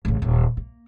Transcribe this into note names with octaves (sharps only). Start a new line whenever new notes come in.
A1 C#3
D#1
A#3